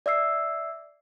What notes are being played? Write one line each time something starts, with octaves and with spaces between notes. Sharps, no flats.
D5 E5 E6 C7